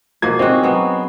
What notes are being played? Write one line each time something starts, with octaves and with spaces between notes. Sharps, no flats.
B2 F3 A#3 G#6 C7
C4 C#4 D#4 F#4 G#4
F#3 B3